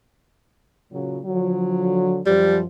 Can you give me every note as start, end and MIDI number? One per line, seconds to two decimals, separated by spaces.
0.93 1.20 46
0.93 1.20 49
0.93 1.20 54
1.26 2.20 50
1.26 2.20 53
1.26 2.20 54
2.26 2.64 42
2.26 2.64 53
2.26 2.59 55